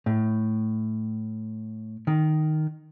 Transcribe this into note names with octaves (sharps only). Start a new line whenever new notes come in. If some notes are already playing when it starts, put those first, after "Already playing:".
A2
D#3